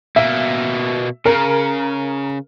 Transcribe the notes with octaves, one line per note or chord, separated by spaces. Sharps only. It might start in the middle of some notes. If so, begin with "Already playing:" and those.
B2 A#3 E5
C#3 A#4